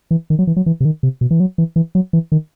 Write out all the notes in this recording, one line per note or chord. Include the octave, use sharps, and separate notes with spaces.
E3
D#3
F#3
E3
F#3
E3
C3
D#3
C3
B2
E3
F#3
E3
E3
F#3
E3
D#3